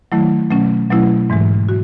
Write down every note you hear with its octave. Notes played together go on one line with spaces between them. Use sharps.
D#3 F#3 A3 E4
B2 F#3 A3 C#4
B2 F#3 A3 C#4 E4
G#2 E3 G#3
F#4